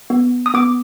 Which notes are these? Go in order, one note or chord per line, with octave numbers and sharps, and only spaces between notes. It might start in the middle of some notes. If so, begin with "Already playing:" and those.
B3
D#6
B3 D6